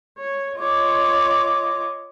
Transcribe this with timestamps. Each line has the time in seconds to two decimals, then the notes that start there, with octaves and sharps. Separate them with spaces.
0.17 C#5
0.57 F4 C#5 D#5 D6